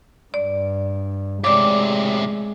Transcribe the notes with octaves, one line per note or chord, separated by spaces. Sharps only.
G2 D5
A2 C3 G#3 D5 D6